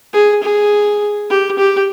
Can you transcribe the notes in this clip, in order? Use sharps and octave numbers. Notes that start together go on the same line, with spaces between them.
G#4
G#4
G4
G4